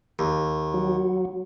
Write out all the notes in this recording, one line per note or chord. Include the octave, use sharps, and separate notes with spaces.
D#2
F#3